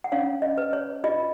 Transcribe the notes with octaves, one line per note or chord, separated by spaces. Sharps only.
F#5
C#4 C#5 F5
D#5
B4
C#5
F4 D#5